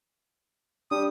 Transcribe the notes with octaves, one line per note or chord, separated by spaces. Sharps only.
G3 D4 D#6